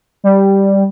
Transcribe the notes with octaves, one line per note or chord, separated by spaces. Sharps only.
G3